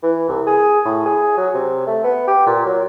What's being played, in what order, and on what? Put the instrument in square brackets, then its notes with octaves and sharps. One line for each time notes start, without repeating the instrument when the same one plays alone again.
[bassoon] E3
C2
G#4
A2
G#4
F#3
C3
A3
B3
G4
A#2
F#3